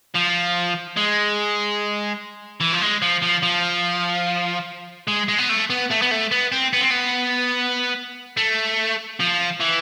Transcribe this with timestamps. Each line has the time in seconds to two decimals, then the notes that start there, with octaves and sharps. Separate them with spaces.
0.15 F3
0.97 G#3
2.60 E3
2.73 F3
2.82 G#3
3.02 F3
3.22 F3
3.43 F3
5.08 G#3
5.28 G#3
5.38 B3
5.49 A3
5.70 B3
5.90 A3
6.02 B3
6.11 A3
6.31 B3
6.52 C4
6.73 B3
6.81 C4
6.90 B3
8.37 A3
9.20 F3
9.60 E3